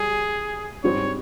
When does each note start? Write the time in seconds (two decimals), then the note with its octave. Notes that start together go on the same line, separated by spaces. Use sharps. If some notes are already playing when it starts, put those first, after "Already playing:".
Already playing: G3 G#4
0.84 G#2 G3 C4 C#5